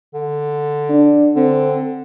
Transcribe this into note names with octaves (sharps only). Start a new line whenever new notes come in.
D3
D4
D3 C4